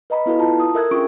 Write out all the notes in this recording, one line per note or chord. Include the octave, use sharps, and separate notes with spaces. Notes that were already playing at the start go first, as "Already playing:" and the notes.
B4 D#5 A#5 B5
B3 E4 F#4 A4 B4
F4 A5 A#5
D#6
A4 A#4 E5 E6 F#6 G#6
C#4 D4 F4 G#4 C#6 D7